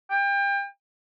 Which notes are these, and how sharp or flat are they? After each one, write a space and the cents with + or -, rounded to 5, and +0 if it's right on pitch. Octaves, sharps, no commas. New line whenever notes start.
G5 +30